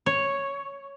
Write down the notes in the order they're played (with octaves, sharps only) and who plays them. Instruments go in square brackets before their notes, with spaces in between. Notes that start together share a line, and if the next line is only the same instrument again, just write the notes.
[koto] C#5